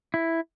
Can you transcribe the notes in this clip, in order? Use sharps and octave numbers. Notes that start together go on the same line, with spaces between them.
E4